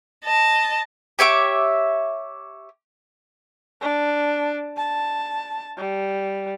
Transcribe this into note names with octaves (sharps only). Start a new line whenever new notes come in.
D#5 A5
G4 C#5 E5 D6
D4
A5
G3